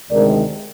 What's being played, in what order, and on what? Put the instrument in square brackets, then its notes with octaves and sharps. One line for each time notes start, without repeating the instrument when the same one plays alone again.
[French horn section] D2 C3 D#3 G#3 A#4 D5